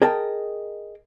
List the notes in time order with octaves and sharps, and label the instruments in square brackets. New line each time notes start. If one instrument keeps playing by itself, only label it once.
[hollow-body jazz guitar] G#4 A#4 D#5 G5 A5